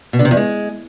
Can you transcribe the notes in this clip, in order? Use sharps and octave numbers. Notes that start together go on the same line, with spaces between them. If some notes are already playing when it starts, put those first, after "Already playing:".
B2
D3
C3
E2
G#3